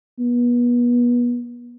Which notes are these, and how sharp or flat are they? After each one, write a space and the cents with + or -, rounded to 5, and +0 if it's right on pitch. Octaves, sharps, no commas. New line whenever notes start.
B3 -30